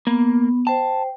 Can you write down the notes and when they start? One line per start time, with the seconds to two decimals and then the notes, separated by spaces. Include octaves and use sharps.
0.07 A#3 B3
0.67 C5 G5 A5